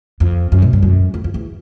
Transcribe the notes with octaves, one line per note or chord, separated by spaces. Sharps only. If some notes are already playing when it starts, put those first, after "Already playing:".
F2
F#2
B2
G2
F#2
F2
F2
E2